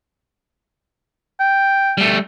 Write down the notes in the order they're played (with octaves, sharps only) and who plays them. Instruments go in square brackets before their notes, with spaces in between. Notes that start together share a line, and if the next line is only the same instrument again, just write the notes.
[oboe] G5
[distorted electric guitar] G3 A3